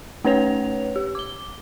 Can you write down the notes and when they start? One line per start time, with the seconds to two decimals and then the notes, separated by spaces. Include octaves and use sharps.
0.25 A3 C#4 B4 C#5 F7
0.96 G4
1.15 D6 G7